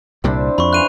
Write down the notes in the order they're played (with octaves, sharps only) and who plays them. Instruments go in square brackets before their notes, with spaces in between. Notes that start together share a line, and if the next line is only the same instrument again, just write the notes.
[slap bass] C2 A#2 G3 [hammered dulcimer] C4 D4 E4
[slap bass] F2 [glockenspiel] B5 C#6
[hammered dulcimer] C#3 E3 C5 [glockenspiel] F#6 D#7 F7